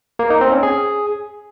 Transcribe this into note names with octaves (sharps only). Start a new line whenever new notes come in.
A#3
D#4
C4
C#4
G#4